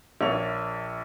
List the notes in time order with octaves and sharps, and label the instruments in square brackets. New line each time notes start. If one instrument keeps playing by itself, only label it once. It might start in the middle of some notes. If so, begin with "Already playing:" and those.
[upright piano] A#1 A#3 C#5 F7